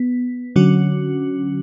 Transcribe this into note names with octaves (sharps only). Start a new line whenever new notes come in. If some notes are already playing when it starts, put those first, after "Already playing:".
Already playing: B3
D3 F#3 C#4 F#4